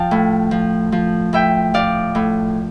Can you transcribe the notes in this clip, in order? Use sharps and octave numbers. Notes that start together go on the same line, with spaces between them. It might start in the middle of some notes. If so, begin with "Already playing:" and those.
Already playing: F3 F5 G5 A5
A2
F3
F3
A2 E5 G5
F3 D5 F5
A2